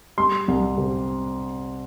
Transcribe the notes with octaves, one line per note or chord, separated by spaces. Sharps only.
G3 C6
C2
C3